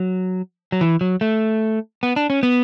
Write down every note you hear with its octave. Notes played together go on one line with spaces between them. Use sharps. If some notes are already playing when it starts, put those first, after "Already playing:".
Already playing: F#3
F#3
E3
F#3
A3
B3
D4
C#4
B3